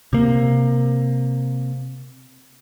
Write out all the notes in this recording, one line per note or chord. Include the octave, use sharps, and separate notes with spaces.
C3 A#3